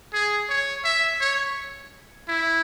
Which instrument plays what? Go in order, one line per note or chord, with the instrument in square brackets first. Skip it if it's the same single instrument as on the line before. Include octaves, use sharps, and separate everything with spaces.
[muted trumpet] G#4
C#5
E5
C#5
E4